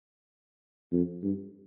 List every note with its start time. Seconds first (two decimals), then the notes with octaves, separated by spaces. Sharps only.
0.92 F2
1.23 G2